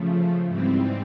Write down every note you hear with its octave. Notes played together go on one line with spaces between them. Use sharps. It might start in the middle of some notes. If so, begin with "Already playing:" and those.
Already playing: C#3 F3 A3
G#2 E3 G3 C4